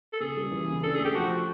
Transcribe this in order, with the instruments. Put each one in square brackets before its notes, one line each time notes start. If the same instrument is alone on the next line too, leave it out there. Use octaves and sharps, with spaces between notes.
[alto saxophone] A4
[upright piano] C#3 [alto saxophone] G#4
[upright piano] G3
E3
C#3
[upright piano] D4 [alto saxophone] A4
[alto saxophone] G#4
[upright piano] A3
[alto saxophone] G4
[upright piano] F3 [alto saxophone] F#4